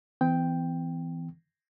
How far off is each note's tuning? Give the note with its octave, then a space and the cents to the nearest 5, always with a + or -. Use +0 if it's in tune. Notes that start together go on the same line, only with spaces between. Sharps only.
E3 +0 C4 -45 G5 +0